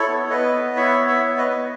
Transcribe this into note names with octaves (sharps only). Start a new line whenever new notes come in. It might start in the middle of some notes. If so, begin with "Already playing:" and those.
Already playing: E4 A4 C#5
B3
B3 B4 D#5
B3
E4 C#5 E5
B3
C#5 E5
B3
B4 D#5
B3